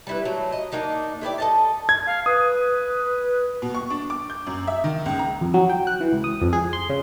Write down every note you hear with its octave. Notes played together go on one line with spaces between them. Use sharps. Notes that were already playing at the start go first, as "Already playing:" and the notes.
G3 E4 B4
F#3 A3
D#5
A#3 D4 D#4 D#5
A3 E4 G4 D5
A4 D#5 A5
G#6
F5
B4 D#6
B2
C#6
D4
D6
G6
F#2
E5
D#3
C#2
A#5
F2
F#3
G5
F#6
E3
C#2
D#6
F2
G#4
C6
C#3